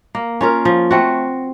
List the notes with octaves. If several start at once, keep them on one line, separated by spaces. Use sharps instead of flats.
A#3
C#4 F4 A#4
F3
A3 C4 F#4